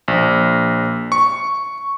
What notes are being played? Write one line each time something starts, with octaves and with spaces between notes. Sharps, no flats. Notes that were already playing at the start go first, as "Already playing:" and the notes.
A#1
C#6